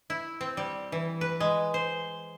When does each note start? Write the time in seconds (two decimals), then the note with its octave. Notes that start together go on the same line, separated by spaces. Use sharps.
0.10 E4
0.41 C4
0.57 G3
0.92 E3
1.21 B4
1.40 G#3
1.74 C5